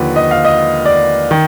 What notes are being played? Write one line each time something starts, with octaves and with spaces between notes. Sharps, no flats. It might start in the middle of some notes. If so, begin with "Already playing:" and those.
Already playing: D#2 D3 F3 B4
D#5
F5
D#5
D5
D#3